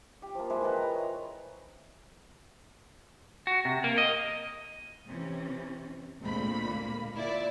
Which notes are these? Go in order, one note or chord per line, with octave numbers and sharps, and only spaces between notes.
G4
F3 A#3
G#3 E4 C5
E3 A4 B4 D#5
A#5
C#5
F#4
C3
A#3
D#5
C3 E3 C#4
D2 A#2 G#3 C4 B5
G#2 A#3
A#2 E4 D5